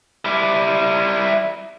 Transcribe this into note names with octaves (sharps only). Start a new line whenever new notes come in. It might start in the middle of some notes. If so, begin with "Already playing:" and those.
G3 E4